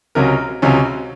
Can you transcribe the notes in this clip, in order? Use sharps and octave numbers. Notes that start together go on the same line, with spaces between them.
C#2 C3 F#3 C#4 A#4
C#2 C3 F#3 C#4